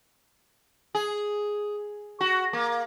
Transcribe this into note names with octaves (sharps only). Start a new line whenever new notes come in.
G#4
F#4
A#3